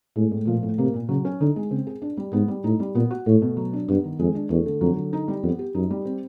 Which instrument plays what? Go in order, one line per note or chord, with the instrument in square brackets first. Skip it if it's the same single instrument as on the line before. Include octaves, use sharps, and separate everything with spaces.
[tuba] A2 [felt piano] G#3
[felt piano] A2
[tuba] A#2 [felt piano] F3
[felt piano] A2
[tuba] C3 [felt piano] A#3
[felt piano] A#2
[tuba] C#3 [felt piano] F#3
[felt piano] C#4
[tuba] D3 [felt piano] D#4
[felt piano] G#3
[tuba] C#3 [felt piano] C4
[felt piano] G#4
D4
G3
[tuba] G#2 [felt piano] B3
[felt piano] G3
[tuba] A2 [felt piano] D#4
[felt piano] G3
[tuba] A#2 [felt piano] B3
[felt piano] F#4
[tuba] A2 [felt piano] A3
[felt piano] B2
F#3
D4
[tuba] G2 [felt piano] B3
[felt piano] D#3
[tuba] F2 [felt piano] G#3
[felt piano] D4
[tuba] E2 [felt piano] A3
[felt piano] D3
[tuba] F2 [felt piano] F#3
[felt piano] D3
D#4
G3
[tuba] F2 [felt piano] B3
[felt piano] G4
[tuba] F#2 [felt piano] D#4
[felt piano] G3
C4